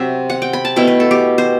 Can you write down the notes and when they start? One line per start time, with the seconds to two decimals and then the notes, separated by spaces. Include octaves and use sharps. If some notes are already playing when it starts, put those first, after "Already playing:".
Already playing: C3 F#3 C4 E5
0.30 F#5
0.42 G5
0.53 B5
0.65 A5
0.76 B2 A3 E4 G5
0.88 B4
1.00 A4
1.11 G4
1.38 C5